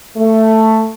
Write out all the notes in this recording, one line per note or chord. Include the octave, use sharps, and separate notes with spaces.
A3